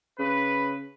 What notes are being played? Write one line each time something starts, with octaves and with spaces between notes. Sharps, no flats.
C#3 B4